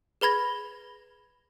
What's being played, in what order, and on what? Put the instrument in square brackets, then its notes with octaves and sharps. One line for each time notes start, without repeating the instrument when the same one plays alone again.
[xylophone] G#4 B4 B5 G#6 A#6